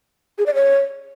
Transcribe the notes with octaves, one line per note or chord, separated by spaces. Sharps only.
G#4
D5
C#5